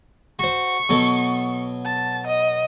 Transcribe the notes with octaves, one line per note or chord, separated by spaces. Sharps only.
F#4 C5 C#6
B2 F#3 A4
A5
D#5